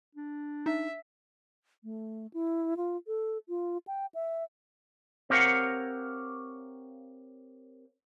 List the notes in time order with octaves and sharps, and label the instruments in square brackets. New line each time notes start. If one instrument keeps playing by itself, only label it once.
[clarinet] D4
[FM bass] D#4 [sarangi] E5
[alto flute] A3
E4
F4
A4
F4
G5
E5
[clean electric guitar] C4 G4 A#4 C#5 F5 F#5